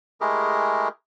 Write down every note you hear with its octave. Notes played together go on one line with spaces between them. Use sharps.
G#3 A3 E4 G4 G#4 A#4